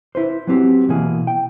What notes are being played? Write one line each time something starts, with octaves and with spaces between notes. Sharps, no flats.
E4 B4 C5
F#3 B3 C4 G4
B2 E3 A#3 G#4
G5